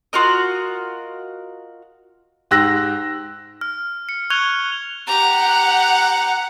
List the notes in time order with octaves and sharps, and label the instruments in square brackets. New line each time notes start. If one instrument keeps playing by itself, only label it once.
[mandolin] F4 F#4 A#4 D#5
[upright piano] G#2 G4 E6 F#6 A#6
[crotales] F6
C#7
C#6 F6 F#6 G#6 F7 G7
[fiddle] G4 A#5 [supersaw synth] F#5